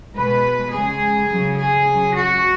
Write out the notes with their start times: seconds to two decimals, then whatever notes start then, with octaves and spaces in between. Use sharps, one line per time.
0.16 B2 G#3 B4
0.72 C#3 G#3 G#4
1.30 C#3 F#3
1.58 G#4
1.87 C#3 F#3
2.15 F#4